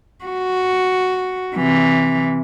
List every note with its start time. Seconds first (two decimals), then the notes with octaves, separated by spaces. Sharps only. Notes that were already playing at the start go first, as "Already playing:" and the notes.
0.25 F#4
1.55 C3 E3